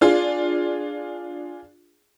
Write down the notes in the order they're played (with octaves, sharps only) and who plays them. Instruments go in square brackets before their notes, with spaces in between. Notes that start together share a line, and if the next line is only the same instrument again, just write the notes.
[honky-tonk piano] D4 F4 G#4